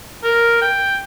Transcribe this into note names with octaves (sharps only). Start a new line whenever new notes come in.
A#4
G5